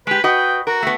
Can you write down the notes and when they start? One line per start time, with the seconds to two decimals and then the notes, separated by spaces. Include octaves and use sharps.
0.07 G#3 G4 B4
0.24 F#4 B4 D#5 G5
0.67 F#4 A#4
0.83 A3 B3